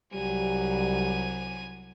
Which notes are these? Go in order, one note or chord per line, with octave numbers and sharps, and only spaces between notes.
C2 F#3 G3 G#5 D#7